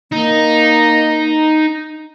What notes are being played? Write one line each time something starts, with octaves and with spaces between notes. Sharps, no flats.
A#3 D#4